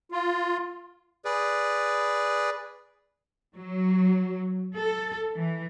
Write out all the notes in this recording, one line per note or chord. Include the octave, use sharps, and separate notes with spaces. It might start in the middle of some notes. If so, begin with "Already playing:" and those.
F4
G#4 B4 D5
F#3
A4
E3